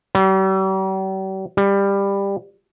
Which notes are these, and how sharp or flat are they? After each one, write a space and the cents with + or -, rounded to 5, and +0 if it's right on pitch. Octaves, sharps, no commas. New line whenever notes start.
G3 -45
G3 +15